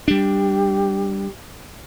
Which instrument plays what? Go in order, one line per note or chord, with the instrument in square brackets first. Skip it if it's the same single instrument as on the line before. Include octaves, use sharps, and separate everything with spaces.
[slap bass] G3 D4 [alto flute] G4